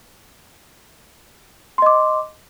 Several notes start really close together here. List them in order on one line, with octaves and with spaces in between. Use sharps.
C6 D#5 D6